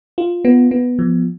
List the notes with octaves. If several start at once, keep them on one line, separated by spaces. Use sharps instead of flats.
F4
B3
B3
F3